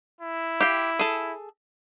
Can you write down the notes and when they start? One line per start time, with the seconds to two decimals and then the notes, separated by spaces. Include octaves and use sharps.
0.21 E4
0.61 G4 F5 G5
0.99 G#4 A4